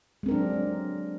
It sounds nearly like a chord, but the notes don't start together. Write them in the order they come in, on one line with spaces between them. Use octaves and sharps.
G#3 C4 A#4 D4 F#3